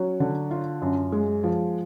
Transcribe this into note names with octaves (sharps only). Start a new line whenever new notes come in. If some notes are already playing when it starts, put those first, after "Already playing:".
Already playing: F#3 C#4
D3
F4
F#2
G#3
F3